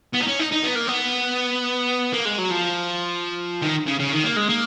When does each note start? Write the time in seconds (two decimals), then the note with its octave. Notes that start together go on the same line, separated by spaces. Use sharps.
0.13 B3
0.21 D#4
0.27 C#4
0.39 D#4
0.51 D#4
0.64 B3
0.75 A#3
0.87 B3
2.13 A#3
2.25 G#3
2.38 F#3
2.51 F3
3.62 D#3
3.87 C#3
4.00 C#3
4.12 D#3
4.25 A#3
4.37 G#3
4.49 A#3